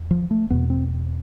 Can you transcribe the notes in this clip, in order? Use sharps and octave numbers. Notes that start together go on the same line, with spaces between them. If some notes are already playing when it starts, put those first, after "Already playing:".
Already playing: E2
F3
A3
E2 B2 B3
C4